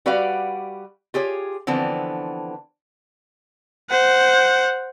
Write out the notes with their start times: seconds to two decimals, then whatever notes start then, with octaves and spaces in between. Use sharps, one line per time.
0.06 G3 F#4 B4 D5 F5 F#5
1.14 F4 G4 G#4 C#5
1.67 D3 E3 F3 B3 C4
3.90 C5 F#5